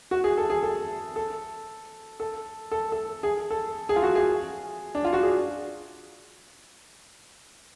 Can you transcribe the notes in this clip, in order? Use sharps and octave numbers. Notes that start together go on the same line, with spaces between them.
F#4
G#4
A4
G#4
A4
A4
A4
A4
A4
G#4
A4
G#4
F4
F#4
G#4
D4
F4
F#4
G#4